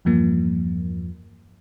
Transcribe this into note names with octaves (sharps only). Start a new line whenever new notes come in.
E2 G2 F3 A#3